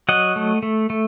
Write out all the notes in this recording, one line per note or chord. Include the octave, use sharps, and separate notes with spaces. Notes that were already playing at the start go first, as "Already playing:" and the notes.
F#3 D#5 F#5
A3
A3
A3